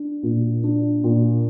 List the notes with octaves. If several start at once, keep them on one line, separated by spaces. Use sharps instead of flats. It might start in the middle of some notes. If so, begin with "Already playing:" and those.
Already playing: D4
A#2
D4
A#2